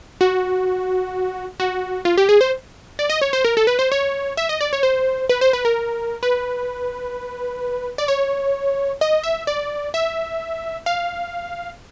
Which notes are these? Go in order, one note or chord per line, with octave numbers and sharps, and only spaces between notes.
F#4
F#4
F4
G4
G#4
C5
D5
D#5
C#5
C5
A#4
A4
B4
C5
C#5
E5
D#5
D5
C#5
C5
B4
C5
B4
A#4
B4
D5
C#5
D#5
E5
D5
E5
F5